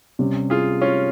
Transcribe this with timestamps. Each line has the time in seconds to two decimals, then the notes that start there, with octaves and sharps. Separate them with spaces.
0.19 C3 G3 C#4
0.50 F4 G#4
0.82 C#4 F4